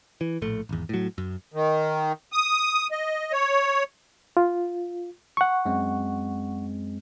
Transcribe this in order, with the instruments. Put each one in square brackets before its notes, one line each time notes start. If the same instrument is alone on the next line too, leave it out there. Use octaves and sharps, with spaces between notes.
[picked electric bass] E3
A#1 A2 A3
G#1 E2
A2 F#3
F#2
[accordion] D#3
D#6
D#5
C#5
[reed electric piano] F4
F#5 C#6
[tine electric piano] F#2 G#3 C4